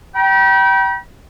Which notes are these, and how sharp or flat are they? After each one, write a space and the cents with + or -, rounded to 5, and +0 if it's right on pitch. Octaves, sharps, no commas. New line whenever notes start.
G5 -25 B5 -45